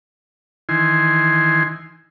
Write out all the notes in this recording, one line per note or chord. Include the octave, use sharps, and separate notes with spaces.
D#3 E3 G#5 C6